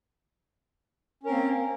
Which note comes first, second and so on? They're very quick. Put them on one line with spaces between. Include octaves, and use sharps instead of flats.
C#4 A#4 C4 A#3